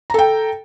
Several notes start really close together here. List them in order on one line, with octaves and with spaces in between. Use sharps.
A#5 A4 G5